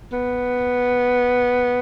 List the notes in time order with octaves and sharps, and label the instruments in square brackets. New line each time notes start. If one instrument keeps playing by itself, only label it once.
[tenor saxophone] B3